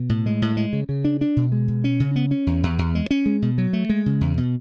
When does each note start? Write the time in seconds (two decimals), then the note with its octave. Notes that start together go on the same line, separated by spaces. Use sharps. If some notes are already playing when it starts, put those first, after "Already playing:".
Already playing: B2
0.09 A2
0.26 G#3
0.42 A2
0.57 G#3
0.73 C#3
0.89 C#3
1.05 D4
1.21 D4
1.36 B2
1.52 G#3
1.68 B2
1.84 C#4
2.00 C#3
2.16 B3
2.31 C#4
2.47 E2
2.63 E2
2.79 E2
2.95 G#3
3.11 C#4
3.26 G#3
3.42 B2
3.58 F#3
3.73 A3
3.89 G#3
4.06 C#3
4.21 E2
4.37 B2